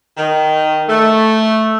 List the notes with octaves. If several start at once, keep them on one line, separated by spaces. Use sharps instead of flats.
D#3
A3